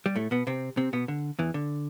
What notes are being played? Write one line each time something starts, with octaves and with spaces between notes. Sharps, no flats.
G3
A2 A3
B2 B3
C3 C4
C3 C4
B2 B3
D3
E2 E3
D3